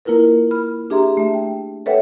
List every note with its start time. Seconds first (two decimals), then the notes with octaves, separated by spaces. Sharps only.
0.05 A#3 E4 F4 A#4 B4
0.51 B5 F6
0.90 D4 G4 G#4 E5 A#5 C6
1.17 A3 E5
1.34 G5
1.86 A4 B4 C#5 E5 F#5 G5